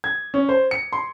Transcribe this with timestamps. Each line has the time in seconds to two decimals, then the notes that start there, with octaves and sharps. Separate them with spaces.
0.04 G#6
0.34 C#4
0.49 C5
0.71 C#7
0.93 C6